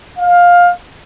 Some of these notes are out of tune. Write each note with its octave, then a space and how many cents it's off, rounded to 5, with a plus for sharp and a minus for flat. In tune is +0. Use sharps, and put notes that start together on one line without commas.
F5 +15